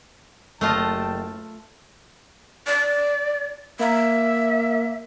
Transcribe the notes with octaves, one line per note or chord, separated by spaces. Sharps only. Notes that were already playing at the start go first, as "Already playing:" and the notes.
F#1 A3 F4 D#5 G5 A5
D5
A#3 E5